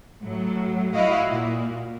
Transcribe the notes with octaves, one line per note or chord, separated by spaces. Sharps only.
A2 F#3
E4 F#4 D#5 F5
A#2